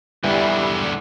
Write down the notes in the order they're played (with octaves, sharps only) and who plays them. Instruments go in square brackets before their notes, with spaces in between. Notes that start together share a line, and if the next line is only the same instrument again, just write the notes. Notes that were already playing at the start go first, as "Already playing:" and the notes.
[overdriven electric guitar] E2 D3 [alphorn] E3 [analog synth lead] G3